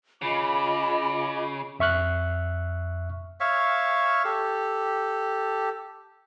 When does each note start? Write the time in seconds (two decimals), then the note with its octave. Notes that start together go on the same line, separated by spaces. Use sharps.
0.22 C#3 F4 D#5 B5 D6
1.79 F2 E5 C#6 F6 F#6
3.40 C#5 E5 F5 C#6
4.25 G4 A4